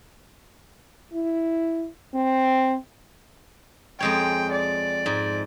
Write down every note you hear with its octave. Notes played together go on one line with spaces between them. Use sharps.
E4
C4
F2 G#3 C#5 G5
D5
G#2